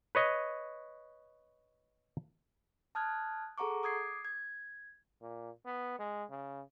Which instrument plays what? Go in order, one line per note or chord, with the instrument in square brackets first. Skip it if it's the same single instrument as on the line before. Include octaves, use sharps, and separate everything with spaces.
[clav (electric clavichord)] B4 C#5 D#5
[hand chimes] A5 D#6 F6 F#6 G#6
G#4 A4 F#5 A#5 C#6 D6
D6 D#6 G#6 C7
G#6
[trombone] A#2
B3
G#3
C#3